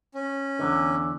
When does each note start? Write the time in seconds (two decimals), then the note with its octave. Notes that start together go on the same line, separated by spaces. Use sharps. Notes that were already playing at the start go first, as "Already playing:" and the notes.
0.15 C#4
0.59 E2 G#2 D3